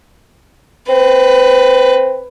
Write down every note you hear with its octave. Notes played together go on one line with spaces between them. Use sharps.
C4 B4